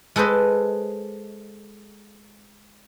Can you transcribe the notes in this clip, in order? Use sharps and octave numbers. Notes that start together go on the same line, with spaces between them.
G#3 A4 B4 C5 D#5